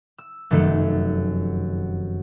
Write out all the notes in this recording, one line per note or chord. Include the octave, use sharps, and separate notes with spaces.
E6
F1 F#2 D#3 A3 A4 C#7